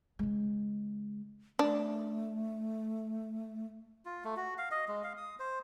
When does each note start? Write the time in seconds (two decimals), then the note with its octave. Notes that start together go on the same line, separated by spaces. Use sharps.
0.19 C#3 G#3
1.59 A3 D4
4.05 F4
4.24 A3
4.37 F#4
4.58 F5
4.71 D#5
4.88 G#3
5.04 F5
5.17 D#6
5.39 C5